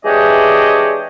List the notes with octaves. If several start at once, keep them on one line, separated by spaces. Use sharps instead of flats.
E3 G#3 D4 G4 C#5 D#5